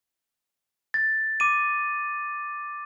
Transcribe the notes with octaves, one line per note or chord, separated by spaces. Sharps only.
A6
D6 D#7